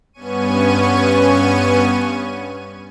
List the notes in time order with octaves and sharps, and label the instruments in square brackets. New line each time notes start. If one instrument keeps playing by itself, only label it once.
[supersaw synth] G2 B3 C#4 G#5 C#6 D#7